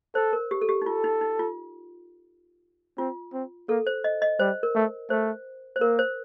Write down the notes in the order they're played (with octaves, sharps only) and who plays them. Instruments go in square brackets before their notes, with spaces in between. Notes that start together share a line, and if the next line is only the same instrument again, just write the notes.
[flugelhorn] A4 [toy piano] C5
[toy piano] A#4
G4
A4
G4
D#4
[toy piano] F4 [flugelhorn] A4
[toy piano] D#4
D#4
F4
[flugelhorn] C4 [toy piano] F4
[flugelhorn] C4
[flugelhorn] A#3 [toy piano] A4
[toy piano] C5
D#5
D#5
[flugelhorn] G3 [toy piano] C5
[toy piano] A#4
[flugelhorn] A3
[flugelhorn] A3 [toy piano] C5
[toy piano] C5
[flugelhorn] A#3 [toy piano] A#4
[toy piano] C5